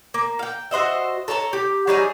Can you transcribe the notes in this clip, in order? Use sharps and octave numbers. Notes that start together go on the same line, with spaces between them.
A#3
F5 G5
F#4 C5 D#5 E5
A4 C#5 A5 A#5
G4
F#3 G3 D#4 G#4